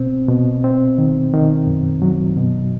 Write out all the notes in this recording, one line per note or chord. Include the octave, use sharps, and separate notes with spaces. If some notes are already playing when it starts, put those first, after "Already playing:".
Already playing: B2 C4
B2
C4
D#3
D#3
F#2
F#3
B2